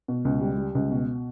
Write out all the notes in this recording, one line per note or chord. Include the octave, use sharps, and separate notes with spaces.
B2
C#2
G3
G3
C#2
B2